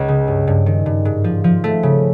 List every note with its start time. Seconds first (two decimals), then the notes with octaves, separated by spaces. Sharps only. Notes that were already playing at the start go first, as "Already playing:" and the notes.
Already playing: C#2
0.08 C#3
0.28 G2
0.47 G2
0.66 D#3
0.86 G2
1.05 G#2
1.24 F3
1.44 F3
1.64 A3
1.83 C#3